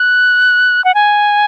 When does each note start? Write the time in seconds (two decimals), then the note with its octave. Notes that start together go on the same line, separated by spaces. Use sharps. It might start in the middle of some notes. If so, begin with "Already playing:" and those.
Already playing: F#6
0.84 F#5
0.95 G#5